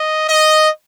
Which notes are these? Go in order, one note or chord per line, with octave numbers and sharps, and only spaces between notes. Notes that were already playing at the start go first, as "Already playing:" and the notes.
Already playing: D#5
D#5